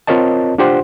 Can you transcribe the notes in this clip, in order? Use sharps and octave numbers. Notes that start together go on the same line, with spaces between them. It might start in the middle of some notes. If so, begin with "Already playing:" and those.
C4 F4 A#4 C#5 D#5 A5
D4 F4 G4 C5 F#5 C6